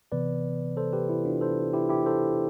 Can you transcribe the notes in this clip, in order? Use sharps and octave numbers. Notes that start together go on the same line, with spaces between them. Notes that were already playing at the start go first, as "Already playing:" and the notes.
C3 E3 B3 B4 D5
A4 C5
G4 B4
E4
D4 F4
A4 C5
E4 G4
E4 G4
A4 C5